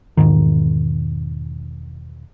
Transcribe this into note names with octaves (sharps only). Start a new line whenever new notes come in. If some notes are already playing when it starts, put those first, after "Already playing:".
E1 C2 G#2 D#3